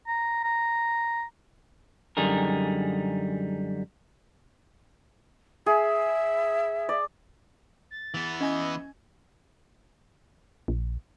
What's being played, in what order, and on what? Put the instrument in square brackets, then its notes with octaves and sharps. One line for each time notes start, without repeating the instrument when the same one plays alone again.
[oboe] A#5
A#5
[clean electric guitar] F#2 D3 G3 D#4 G#4 A#4
[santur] G#4 [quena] E5
[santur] D5
[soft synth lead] A6
[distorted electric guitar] E3 B3
[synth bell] C#4 G#5 G#6 [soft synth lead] D#5
[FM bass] A#1